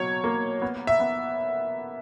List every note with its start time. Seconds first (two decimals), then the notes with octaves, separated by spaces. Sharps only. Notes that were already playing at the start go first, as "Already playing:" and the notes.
Already playing: B2 F#3 A#3 C#5
0.24 A#3
0.62 B3
0.87 E5
1.00 B3